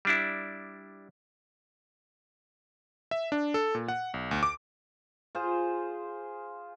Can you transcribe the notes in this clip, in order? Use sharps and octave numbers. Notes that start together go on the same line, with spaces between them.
G3 D4 E4
E5
D4
A4
A#2
F#5
B1
D2
D6
F4 G#4 C5